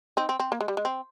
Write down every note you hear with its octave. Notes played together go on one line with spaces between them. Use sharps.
C4 D#4
C4
C4
A#3
G#3
G3
G#3
C4